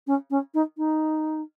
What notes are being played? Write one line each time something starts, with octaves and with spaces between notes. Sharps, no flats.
C#4
C#4
D#4
D#4